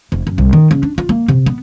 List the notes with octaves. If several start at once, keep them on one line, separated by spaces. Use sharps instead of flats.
F1
F#2
C2
D#3
C#3
D4
F4
A#3
C3
B3